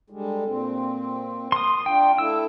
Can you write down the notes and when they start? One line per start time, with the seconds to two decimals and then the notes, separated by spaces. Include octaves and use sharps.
0.10 D3 G3 G#3
0.46 A#2 C4
1.52 C6 D#6
1.86 D4 F4 G5
2.18 A3 E4 E6